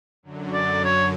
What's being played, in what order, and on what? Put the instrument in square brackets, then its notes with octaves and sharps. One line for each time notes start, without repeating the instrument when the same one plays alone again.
[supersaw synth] F#2 D3 F#3
[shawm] D5
C#5